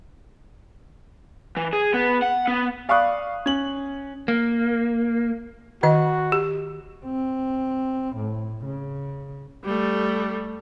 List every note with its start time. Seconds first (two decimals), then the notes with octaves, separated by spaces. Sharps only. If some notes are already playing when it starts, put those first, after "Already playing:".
1.57 E3
1.73 G#4
1.94 B3
2.22 F#5
2.48 B3
2.89 D5 F5 B5 C#6 D#6 F#6
3.46 C#4 F#7
4.28 A#3
5.83 D#3 F#4 D#5
6.32 G4
7.05 C4
8.17 A2
8.65 C#3
9.64 G3 A3